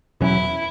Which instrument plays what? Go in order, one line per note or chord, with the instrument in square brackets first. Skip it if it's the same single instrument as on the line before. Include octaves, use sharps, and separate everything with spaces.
[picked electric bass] E2 B2 F#3 C#4 [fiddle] E4